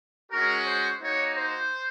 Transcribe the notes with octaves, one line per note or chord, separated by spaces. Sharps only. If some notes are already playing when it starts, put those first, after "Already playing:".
G#3 C#4 F#4 A#4
C5
A#3 D#4 F#4 C#5
C5